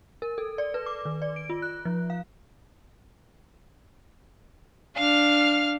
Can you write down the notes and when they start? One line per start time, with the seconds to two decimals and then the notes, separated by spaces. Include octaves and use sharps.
0.22 A#4
0.38 A4
0.58 D5
0.74 B4
0.86 D6
1.05 D#3
1.22 D5
1.36 D7
1.50 F4
1.62 F#6
1.85 F3
2.10 F5
4.96 D4 F5 F6